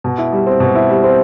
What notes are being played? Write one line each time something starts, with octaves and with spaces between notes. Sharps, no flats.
B2
E4
G3
C4
B2
E4
G3
C4